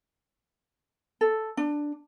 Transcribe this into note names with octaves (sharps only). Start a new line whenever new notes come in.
A4
D4